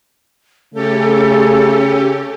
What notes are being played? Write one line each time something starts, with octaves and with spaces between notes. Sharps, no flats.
C#3 A3 C#4 G4 A4